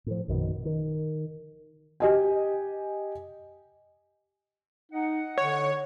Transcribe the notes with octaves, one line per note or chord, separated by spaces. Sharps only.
A2 F3
A#1 F#2 B2 D#3
D#3
G4 D#5 G#5
D#4 D#5 F#5
D3 C#5